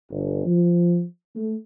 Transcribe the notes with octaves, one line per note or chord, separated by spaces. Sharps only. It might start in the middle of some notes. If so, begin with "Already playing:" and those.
G1
F3
A3